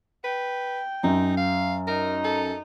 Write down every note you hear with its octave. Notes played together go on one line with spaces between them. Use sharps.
B4 G5
F#2 D#4
F5
D#4 A#4
A4